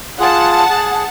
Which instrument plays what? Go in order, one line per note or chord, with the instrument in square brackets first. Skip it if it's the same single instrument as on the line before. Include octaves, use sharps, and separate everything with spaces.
[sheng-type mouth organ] F4 G#4 [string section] F#5 A5
[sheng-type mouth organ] G#4